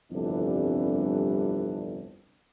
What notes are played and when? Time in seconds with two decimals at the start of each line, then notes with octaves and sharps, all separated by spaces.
0.11 G1 C2 F2 E3 G3 D4